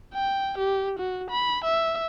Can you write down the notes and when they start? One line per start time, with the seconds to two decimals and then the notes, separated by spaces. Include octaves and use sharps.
0.14 G5
0.58 G4
0.99 F#4
1.30 B5
1.64 E5